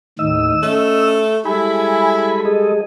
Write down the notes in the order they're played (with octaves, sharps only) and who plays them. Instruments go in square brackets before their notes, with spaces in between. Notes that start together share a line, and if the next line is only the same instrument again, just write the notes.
[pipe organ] D#2 A2 D#3 [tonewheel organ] D#5 E6
[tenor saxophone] A3 [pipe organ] C#4
[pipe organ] G3 G#3 A4 [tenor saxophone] E4 [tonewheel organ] G#5 B5
[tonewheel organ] G#4 D#5